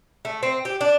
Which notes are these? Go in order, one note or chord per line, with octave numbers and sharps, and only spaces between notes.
A3
C4
G4
D4